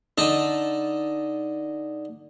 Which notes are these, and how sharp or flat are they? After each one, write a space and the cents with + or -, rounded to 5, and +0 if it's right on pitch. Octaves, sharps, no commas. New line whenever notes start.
D3 +0 D#4 +0 A5 +0